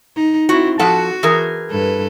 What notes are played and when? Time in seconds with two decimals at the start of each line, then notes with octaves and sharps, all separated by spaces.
0.16 D#4
0.49 C4 E4 F#4
0.79 F3 F#4 A4 F#5
1.23 E3 G#4 A#4
1.70 G2 A4 B4